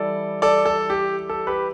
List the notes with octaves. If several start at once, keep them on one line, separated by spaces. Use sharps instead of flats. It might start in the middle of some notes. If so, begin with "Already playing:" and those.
Already playing: E3 G3 E4 A4 D5
A4 D5
A4
G4
A4
G4 B4